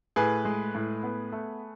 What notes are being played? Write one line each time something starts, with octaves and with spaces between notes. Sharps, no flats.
A2 G#4 B4
G#3
A2
B3
A3